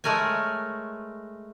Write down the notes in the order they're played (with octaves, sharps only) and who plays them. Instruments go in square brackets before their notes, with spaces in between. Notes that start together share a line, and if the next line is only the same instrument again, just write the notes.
[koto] G#3 A3 A#4 C#5 G#5